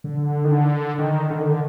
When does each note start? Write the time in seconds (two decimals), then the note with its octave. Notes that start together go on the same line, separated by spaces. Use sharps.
0.04 D3
0.44 D#3
0.51 D3
0.99 D#3
1.30 D3
1.40 D#3
1.50 D3